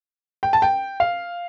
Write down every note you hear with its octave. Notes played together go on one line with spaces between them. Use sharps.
G5
A5
G5
F5